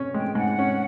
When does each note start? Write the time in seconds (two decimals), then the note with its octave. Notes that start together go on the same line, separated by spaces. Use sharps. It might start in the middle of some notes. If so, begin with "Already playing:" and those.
Already playing: C#4
0.14 G#3 G5
0.35 G#2 F#5
0.59 C#4